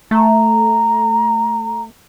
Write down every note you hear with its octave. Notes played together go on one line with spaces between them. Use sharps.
A3 A#5